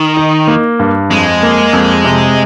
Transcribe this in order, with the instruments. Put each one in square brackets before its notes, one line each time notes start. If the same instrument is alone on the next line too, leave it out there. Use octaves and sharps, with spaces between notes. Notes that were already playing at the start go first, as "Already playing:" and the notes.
Already playing: [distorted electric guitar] D#3
[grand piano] D#4
A#3
G2
[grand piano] F2 [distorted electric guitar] G#3
[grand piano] A#3
F2
C3